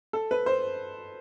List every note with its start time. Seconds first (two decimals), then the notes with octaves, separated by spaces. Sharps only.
0.13 A4
0.31 B4
0.46 C5